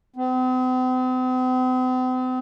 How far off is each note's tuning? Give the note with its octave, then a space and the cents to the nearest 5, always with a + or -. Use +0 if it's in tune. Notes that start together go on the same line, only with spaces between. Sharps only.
C4 -45